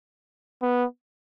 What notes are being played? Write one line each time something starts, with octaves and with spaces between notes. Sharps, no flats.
B3